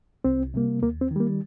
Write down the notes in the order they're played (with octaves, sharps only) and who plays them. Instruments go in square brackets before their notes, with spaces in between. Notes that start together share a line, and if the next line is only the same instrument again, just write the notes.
[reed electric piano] C2 C4
C3 G3 A#3
D#2 A#3
C4
D#3
G3 A#3